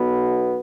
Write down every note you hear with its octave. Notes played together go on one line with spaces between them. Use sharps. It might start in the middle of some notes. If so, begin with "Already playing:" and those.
Already playing: B1 B2 B3